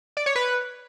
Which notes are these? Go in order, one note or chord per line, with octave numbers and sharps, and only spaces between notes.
D5
C#5
B4